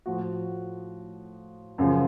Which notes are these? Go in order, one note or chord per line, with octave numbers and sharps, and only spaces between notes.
A2 F3 F#4
F#2 C#3 F3